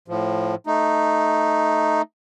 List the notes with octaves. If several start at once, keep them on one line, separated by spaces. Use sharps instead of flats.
A2 F3
A3 D#4